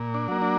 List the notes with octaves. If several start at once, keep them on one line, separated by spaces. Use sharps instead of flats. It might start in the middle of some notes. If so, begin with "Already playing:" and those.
Already playing: A#2
D4
F#3 A#3
D4